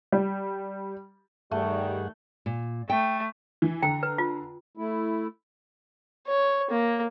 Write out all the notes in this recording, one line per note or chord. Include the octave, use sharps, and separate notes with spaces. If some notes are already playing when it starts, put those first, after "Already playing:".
G3
G2 D#3 G3 A3 G#4 F#5
A#2
A3 G5
E3
D3 G5 A#5
B4
F4
A3 E4
C#5
A#3